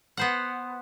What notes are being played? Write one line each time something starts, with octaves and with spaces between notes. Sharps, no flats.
B3 C5 F#5